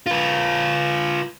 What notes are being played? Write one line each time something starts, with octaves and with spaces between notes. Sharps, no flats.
F4 B4